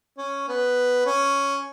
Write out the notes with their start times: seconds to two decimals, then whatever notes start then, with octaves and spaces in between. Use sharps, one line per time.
0.18 C#4
0.48 B3
1.06 C#4